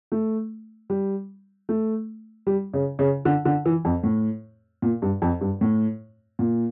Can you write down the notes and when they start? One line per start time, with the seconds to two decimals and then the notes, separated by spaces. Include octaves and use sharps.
0.12 A3
0.90 G3
1.69 A3
2.47 G3
2.74 C#3
2.99 C#3
3.25 D3
3.45 D3
3.65 E3
3.85 F2
4.04 A2
4.82 A#2
5.02 G2
5.22 F2
5.41 G2
5.61 A2
6.39 A#2